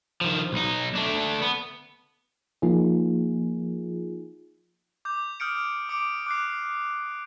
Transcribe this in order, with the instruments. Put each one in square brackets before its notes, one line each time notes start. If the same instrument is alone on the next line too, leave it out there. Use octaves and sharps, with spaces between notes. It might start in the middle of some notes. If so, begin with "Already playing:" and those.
[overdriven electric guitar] D#3 F3
B1 D#4
A3 D4
B3
[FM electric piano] F3 A#3 D#4 F4 G#4
[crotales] D6 G6
D#6 F6 G6 C#7 D7
D6 C#7 D7
D6 F#6 C7